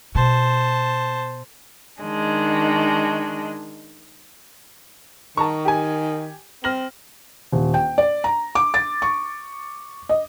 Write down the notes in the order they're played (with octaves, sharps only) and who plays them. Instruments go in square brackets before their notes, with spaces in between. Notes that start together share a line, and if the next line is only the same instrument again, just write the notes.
[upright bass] B2 [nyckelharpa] C5 A5
[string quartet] D#3 G#3 D4
[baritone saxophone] D#3 [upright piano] A5 A#5 C#6
[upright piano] G4 G#5
[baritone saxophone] C4 [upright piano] F6 A#6 F#7
[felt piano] D#1
G5
D5
A#5
D6
A6
C#6
D#5